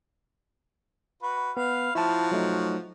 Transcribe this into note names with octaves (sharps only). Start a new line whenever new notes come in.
F#4 B4
B3 B4 F5
F3 E4 F#4 A5
F#3 A3 D#4